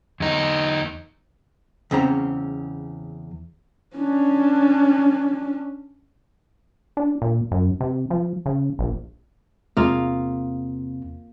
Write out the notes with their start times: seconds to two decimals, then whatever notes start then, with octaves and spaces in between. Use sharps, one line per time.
0.20 E2 D#4
1.91 E2 C#3 C4 C#4 A#5
3.96 C#4 D4
6.97 D4
7.22 A#2
7.51 F#2
7.80 C3
8.10 F3
8.46 C#3
8.79 A#1
9.77 E2 C3 A#3 C4 F4 G#4